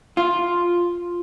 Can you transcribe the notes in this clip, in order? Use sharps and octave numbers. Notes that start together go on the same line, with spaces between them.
F4